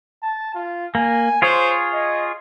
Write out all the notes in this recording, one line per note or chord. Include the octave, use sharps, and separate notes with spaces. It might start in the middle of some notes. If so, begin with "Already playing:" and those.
A5
F4
A#3 G#5
F4 G#4 C5 C#5
D#5